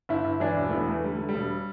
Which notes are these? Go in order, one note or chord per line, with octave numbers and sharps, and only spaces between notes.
G1 E4
G1
E3 D4
E1
A3
E3 B3
E2 A3
D3 G3
D3 A3
G3
E1